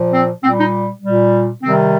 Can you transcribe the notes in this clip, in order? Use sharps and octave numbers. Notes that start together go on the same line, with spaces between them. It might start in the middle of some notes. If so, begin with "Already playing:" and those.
Already playing: A#2 F3
C4
A#2 G3 C4
D#4
A#2 G3
C3 D#3 G3 C4